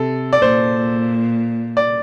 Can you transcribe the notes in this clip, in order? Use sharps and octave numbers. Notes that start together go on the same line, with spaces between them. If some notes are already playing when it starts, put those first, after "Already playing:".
Already playing: C3 A4
D5
A#2 C5
D5